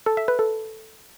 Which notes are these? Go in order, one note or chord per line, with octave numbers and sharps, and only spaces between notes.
A4
E5
B4
A4